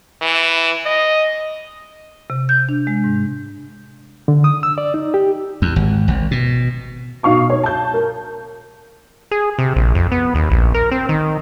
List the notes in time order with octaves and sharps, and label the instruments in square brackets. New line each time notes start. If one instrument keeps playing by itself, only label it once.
[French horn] E3
D#5
[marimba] C3
G6
D4
G#3
G#2
[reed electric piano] D3
D#6
E6
D5
D#4
G4
[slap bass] E2
G#1
G#1
B2
[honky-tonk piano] B2 D#4 F5 C#6 D6
C#5
A5 G6
A#4
[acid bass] G#4
C3
A#1
F2
B3
D#2
A#1
A#4
C4
D#3